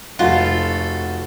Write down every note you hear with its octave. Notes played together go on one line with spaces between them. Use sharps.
F1 F4 F#4 A4